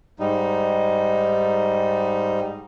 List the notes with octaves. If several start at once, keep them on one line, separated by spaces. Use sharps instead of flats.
G#2 G3 D#4